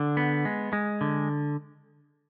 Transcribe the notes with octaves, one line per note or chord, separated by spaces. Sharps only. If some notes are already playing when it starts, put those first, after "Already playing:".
Already playing: D3
B3
G#3
G#3
D3